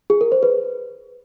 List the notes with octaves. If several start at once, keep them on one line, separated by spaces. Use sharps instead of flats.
G#4
A#4
C5
B4